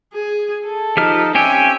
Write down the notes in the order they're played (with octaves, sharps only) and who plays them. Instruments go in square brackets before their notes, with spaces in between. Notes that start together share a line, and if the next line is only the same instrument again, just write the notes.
[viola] G#4
A4
[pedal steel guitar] F3 G4 F6 [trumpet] D#4
[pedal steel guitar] C4 C#4 G4 [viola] E5 [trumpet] G#5